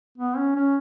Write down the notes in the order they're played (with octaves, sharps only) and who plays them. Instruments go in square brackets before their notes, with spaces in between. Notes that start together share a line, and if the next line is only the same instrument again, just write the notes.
[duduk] B3
C#4
C#4